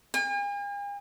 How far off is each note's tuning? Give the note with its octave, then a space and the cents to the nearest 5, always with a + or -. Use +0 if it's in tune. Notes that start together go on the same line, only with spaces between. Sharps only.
G#5 -45